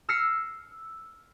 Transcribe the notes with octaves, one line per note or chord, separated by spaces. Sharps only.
E6 F6 A#6 C7 C#7